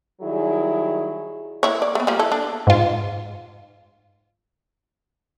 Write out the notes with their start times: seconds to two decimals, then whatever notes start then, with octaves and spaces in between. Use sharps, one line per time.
0.22 D#3 F#3 G3 E4 G#4
1.63 A#3 E4 C#5
1.82 D5
1.95 A3 B3
2.07 F3 G3 A#3
2.19 E4 A4
2.32 D4
2.67 G#2 F4